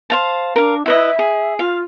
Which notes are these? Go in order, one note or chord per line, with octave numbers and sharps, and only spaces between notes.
C5 F5 A5
D4 A#4 F5
E4 B4 D#5 E5
G#4
F4 F5